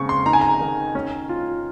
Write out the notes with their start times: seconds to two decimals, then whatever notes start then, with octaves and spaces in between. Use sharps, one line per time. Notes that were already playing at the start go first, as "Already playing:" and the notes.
Already playing: C#3 C4 C#6
0.09 C6
0.26 D#4 A#5
0.33 G#5
0.41 A#5
0.60 D#3
0.95 C#4
1.29 F4